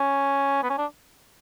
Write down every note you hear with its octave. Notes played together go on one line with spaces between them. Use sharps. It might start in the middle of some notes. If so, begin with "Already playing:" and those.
Already playing: C#4
B3
C#4
D4